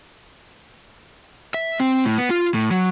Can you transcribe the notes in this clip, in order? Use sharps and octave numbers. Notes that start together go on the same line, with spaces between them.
E5
C4
A2
B3
F4
A2
F#3